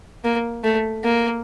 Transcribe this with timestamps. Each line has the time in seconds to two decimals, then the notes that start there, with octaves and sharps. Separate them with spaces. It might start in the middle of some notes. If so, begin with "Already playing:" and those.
0.24 A#3
0.64 A3
1.04 A#3